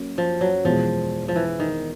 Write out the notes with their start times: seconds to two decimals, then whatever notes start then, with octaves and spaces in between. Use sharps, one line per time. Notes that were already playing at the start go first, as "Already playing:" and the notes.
Already playing: F#2 A#3
0.18 F3
0.41 F#3
0.65 E2 B2 F3 G#3
1.28 F3
1.36 E3
1.60 D#3